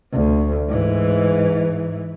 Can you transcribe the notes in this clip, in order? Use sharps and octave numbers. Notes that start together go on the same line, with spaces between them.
D2
G#2 E3